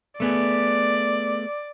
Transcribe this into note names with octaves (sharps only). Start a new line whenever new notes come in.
A3 B3 G#4 D5